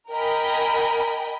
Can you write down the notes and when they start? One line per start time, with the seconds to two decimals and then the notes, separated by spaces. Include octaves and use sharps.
0.10 A#4 D#5 G5 G#5 B5